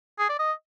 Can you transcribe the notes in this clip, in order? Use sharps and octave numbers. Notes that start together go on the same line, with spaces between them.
G#4
D5
D#5